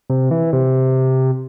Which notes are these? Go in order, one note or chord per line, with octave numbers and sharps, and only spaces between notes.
C3
E3
C3